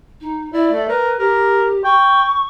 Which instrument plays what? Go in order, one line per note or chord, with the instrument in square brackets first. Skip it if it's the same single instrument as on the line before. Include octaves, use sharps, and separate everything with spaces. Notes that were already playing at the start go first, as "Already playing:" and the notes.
[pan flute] D#4
[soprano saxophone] E4 [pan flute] D5
[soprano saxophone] A3
[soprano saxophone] A#4 [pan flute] B4
[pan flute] G4 [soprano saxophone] A#4
[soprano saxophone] G5 [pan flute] C#6